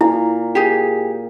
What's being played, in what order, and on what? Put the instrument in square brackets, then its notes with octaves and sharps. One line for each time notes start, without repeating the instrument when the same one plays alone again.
[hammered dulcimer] A#2 [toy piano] E4
[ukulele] G4 G#4